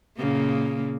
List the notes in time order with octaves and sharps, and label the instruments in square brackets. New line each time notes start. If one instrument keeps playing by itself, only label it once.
[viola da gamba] A#2 C#3 A#3